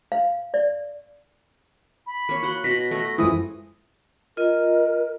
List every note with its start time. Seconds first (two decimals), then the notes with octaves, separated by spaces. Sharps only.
0.12 F5
0.54 D5
2.06 B5
2.29 A#3 C#5
2.43 F#4 F#5 C6
2.64 B2 F#4 A#6 B6
2.91 A3 B3
3.18 F#2 E3 F3 G#3 E4 D#6
4.37 F4 A#4 D#5